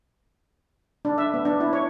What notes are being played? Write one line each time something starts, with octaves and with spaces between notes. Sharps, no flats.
D4
E5
B3
D4
E4
C#5